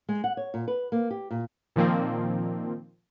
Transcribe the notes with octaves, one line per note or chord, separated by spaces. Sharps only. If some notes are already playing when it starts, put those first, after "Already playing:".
G#3
F#5
C#5
A#2
B4
A#3
G4
A#2
A#2 D#3 F3 A#3 C4